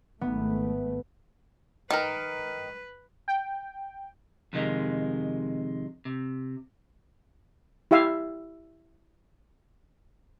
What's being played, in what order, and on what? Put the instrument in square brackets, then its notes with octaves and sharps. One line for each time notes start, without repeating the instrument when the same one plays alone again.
[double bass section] G#1 A3 [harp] B3
[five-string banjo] D#3 A#4 [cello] B4
[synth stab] G5
[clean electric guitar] F2 C3 D#3 G#3
C3
[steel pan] E4 G4 E5 F5